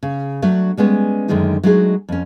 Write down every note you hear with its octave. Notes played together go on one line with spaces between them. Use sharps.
C#3
F#3 A3 D4
G3 G#3 B3 C#4
F#2 D3 D#3 G#3 A3 D#4
F#3 G#3 A3 D4 D#4 G#4
F2 C#4